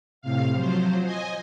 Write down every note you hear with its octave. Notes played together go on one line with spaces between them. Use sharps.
A2 C3 F5
F3 F#3 C5
D#5 G#5